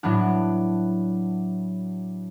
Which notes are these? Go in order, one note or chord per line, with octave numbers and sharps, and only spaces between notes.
A2 F#3 B3 D4 F#6